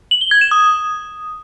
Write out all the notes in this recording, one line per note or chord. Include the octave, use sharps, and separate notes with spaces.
F#7
G7
G#6
E7
D#6